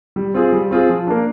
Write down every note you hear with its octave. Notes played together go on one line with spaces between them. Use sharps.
G3
C4 F4 G#4
G3
C4 F4 G#4
F3
A#3 D4